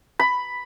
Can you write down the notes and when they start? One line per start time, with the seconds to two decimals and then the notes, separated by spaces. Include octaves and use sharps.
0.19 B5